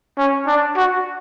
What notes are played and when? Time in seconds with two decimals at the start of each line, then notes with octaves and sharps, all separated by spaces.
0.18 C#4
0.47 D4
0.76 F#4